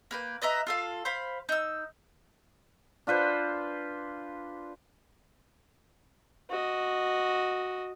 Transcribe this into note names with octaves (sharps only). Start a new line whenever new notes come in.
A#3 B4 G5
B4 D#5 E5 A#5
F4 A4 F5
C5 F5 B5
D#4 E6
D4 F4 B4 C5
F#4 D#5